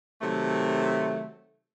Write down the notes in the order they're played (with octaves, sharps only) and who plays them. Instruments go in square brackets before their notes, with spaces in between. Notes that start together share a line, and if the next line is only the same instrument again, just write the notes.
[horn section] C3 D#3 F#3 A3